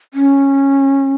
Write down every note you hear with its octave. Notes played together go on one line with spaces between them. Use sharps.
C#4